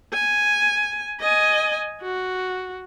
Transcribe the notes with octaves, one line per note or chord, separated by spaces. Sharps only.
G#5
D#5 G#5
F#4